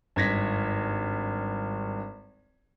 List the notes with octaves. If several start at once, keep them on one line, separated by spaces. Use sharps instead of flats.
G#1 G2 G#6 A#6 B6